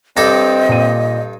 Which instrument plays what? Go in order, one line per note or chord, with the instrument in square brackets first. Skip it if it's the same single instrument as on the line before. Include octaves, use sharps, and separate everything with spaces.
[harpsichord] G2 G4 A4 [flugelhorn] C4 [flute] D#5 [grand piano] A#6
[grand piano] A#2 D#7